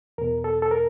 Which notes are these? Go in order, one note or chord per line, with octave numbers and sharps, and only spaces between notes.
E2 B2 A#4
A4
A4
A#4